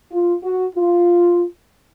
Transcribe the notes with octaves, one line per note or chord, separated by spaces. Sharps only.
F4
F#4
F4